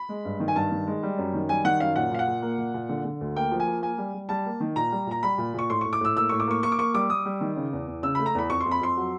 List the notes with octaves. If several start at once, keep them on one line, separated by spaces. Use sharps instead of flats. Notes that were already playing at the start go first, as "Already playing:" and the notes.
Already playing: B5
G#3
G2
D#3
G#5
G2 A5
D#3
G#3
G3
F#2
D#3
G3 G#5
D#3 F#5
F#2 F5
A#2 F#5
A#2 F5
F#5
A#2
A#3
A#2
A#2
D3
D3
D2
A#3 G5
F3
G#5
A#3
A#3 G#5
G3
G3
G3 A5
A#3
D#3
A#2 A#5
G3
A#2 A#5
G3 B5
A#2
A#2 C#6
A2 C6
C#6
A2
D6
A2 E6
A#3 E6
A2 C#6
D6
A#3 C#6
A#3 C#6
D6
A#3 C#6
G3 D6
G3 D#6
G3
D#3
C#3
E2
E2
C#3 E6
B5
A3
A#5
E2 B5
F2 C#6
C6
F2
B5
F2 C6
F#3